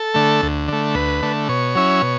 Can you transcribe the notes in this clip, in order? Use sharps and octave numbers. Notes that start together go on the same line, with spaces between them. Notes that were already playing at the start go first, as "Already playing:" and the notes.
Already playing: A4
D3 A3
D2
D3 A3
D2 B4
D3 A3
B2 C#5
F#3 C#4 E4
B2